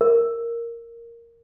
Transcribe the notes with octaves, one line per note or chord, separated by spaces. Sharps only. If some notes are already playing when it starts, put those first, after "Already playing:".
A#4